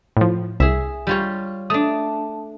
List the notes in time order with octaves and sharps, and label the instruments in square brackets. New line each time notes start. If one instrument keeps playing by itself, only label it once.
[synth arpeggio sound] A2 F3
[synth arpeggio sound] C2 [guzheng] G#4 E5
[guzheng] G3 F4 C#5
[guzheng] A3 D4 [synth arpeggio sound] D#6